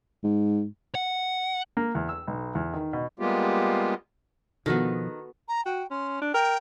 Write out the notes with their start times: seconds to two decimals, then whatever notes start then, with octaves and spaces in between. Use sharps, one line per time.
0.24 G#2
0.95 F#5
1.77 A#3
1.95 E2
2.09 E6
2.27 B1
2.55 E2
2.73 D#3
2.93 B2
3.20 G3 G#3 A#3 B3 F4 G4
4.66 B2 D#3 F3 B3 F#4 A4
5.48 A#5
5.65 F#4 G5
5.90 C#4 C6
6.21 D4
6.34 A#4 G5